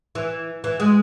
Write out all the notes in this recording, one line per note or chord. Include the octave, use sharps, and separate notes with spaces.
E3
E3
G#3